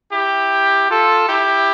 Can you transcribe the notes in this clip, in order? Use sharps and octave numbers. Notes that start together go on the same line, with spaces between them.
E4 G4
F4 A4
E4 G4